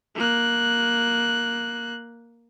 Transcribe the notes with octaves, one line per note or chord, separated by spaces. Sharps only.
A#3 F#6